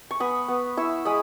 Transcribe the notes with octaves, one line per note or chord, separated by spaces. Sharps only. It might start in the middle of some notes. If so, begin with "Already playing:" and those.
C#6
B3 B5 D#6
B3
E4 C#6 E6
G#3 B5 D#6